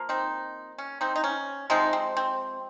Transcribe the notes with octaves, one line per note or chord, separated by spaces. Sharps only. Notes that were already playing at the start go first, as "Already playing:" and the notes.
Already playing: F3 A#3
C4 D#4
C#4
C4 D#4
D#4
C#4
C3 F3 G#3 C4 D#4
C4
C4